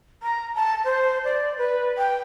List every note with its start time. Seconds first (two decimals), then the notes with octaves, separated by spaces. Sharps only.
0.23 A#5
0.55 A5
0.85 C5
1.24 D5
1.58 B4
1.98 G5